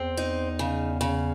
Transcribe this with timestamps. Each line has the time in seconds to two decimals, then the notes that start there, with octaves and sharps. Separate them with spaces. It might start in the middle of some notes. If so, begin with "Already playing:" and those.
Already playing: E2 C4
0.17 D#4
0.59 C#3
1.01 C#3